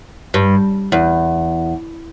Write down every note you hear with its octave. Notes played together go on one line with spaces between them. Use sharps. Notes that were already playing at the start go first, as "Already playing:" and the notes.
G2
E2